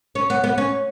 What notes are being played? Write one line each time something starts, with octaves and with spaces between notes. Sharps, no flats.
C#4
B3
B3
C#4